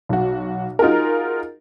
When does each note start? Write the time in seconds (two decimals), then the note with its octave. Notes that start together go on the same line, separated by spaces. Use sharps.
0.09 B1 F#4
0.79 D#4 F4 F#4 G#4 A#4